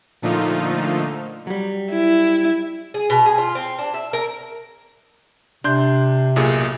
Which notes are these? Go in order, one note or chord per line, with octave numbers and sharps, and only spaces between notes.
A#2 D3 F3 A3 D#4 F4
F#3 G3
E4
G#4
B2
G#4
F4
C4
D4
E5
A#4
C3 D4 C6 G6
B1 A#2 G#4